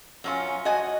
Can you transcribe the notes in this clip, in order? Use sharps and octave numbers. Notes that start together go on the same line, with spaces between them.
F#2 C#4 F4
F#4 D#5 G#5